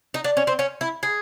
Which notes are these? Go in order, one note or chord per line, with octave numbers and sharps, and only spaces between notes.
D#4
D4
C#4
C4
C#4
E4
G#4